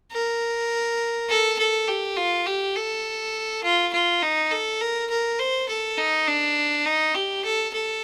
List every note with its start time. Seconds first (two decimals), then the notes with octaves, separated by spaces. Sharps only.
0.12 A#4
1.29 A4
1.58 A4
1.88 G4
2.17 F4
2.46 G4
2.76 A4
3.64 F4
3.93 F4
4.22 D#4
4.51 A4
4.81 A#4
5.10 A#4
5.39 C5
5.69 A4
5.98 D#4
6.27 D4
6.85 D#4
7.15 G4
7.44 A4
7.73 A4